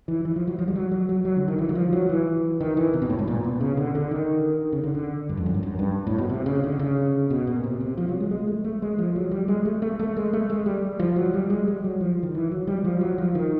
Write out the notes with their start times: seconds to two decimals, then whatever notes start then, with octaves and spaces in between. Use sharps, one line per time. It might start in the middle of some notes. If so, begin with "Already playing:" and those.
0.08 E3
0.25 E3
0.36 F3
0.47 F#3
0.59 F3
0.68 G3
0.76 F#3
0.92 F#3
1.09 F#3
1.25 F#3
1.36 D3
1.48 D#3
1.58 E3
1.69 F#3
1.75 F3
1.93 F#3
2.09 E3
2.61 D#3
2.77 E3
2.94 C3
3.02 B2
3.10 A2
3.19 G#2
3.27 A#2
3.44 B2
3.61 C#3
3.77 D3
3.95 D3
4.11 D#3
4.72 C#3
4.83 D3
4.95 D3
5.29 G2
5.37 F2
5.46 F#2
5.54 G2
5.63 F#2
5.79 G2
6.07 A2
6.18 B2
6.29 C3
6.46 C#3
6.64 D3
6.79 C#3
7.30 B2
7.47 A#2
7.64 C3
7.81 C3
7.98 F3
8.09 F#3
8.20 G#3
8.31 G#3
8.47 A3
8.64 A3
8.82 G#3
8.98 F3
9.16 F#3
9.31 G3
9.48 G#3
9.65 A3
9.82 A3
9.99 A3
10.17 G#3
10.33 A3
10.50 G#3
10.66 G3
10.99 F3
11.16 F#3
11.34 G3
11.50 G#3
11.68 G3
11.84 F#3
12.01 F3
12.23 D#3
12.35 E3
12.51 F#3
12.67 G3
12.85 F3
13.01 F#3
13.18 F3
13.35 D#3